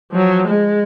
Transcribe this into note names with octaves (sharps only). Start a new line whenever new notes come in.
F3 F#3
G#3